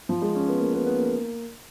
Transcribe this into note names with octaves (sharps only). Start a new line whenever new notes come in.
F3
G#3
C#4
B3
A#3
B3
B3
A#3